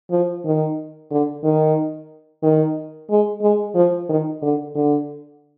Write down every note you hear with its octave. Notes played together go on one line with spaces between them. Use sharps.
F3
D#3
D3
D#3
D#3
G#3
G#3
F3
D#3
D3
D3